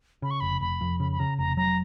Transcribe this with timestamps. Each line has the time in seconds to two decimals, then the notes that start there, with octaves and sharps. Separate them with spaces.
0.22 C#3 B5
0.31 C#6
0.40 F1 B5
0.61 F1 B5
0.81 F2
1.00 C#3 B5
1.12 B5
1.19 C#3 A#5
1.38 F1 A#5
1.57 F#3 A#5